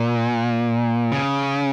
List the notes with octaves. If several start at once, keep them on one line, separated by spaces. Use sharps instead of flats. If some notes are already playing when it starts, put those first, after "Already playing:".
Already playing: A#2
C#3